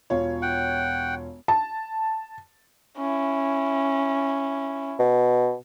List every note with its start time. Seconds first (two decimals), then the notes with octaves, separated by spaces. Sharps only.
0.10 E1 F4 C#5
0.42 F#5 G5
1.48 A5
2.97 C#4 E4
4.99 B2